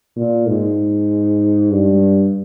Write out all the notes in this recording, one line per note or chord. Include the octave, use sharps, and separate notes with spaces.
A#2
G#2
G2